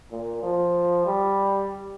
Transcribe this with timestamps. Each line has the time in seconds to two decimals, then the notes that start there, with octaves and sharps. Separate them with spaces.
0.11 A#2
0.43 F3
1.06 G3